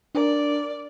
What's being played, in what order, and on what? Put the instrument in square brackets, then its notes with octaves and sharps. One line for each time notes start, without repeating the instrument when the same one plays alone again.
[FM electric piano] D4 A#4 [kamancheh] D5